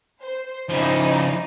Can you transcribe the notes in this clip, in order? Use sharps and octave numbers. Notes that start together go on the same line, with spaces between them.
C5
C#3 F3 D#4 E4 C5 D5